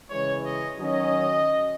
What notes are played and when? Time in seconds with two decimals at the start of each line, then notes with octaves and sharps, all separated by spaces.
0.11 C#3 E3 G#3 C#5
0.45 D#5
0.79 D#3 F#3 C#4 D#5